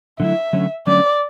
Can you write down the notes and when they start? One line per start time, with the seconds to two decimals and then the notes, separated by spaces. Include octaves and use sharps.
0.20 D3 F#3 A3 E4 E5
0.53 D3 F#3 A3 C#4
0.87 D3 F#3 A3 C#4 D5